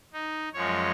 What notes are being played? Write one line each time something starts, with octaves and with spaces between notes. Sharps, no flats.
D#4
F#2 F3 G#3 C#5